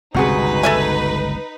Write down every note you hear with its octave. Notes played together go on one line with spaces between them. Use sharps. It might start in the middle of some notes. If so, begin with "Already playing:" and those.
G1 C#2 C3 D#4 F#4 G#4 B4
A4 E5 G#5